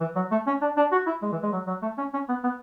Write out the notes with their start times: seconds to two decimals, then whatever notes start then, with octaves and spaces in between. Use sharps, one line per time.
0.01 E3
0.16 F#3
0.31 A3
0.47 C#4
0.62 D4
0.77 D4
0.92 F#4
1.07 E4
1.23 G#3
1.32 E3
1.43 G#3
1.52 F#3
1.67 F#3
1.82 A3
1.98 C#4
2.14 C#4
2.29 B3
2.44 B3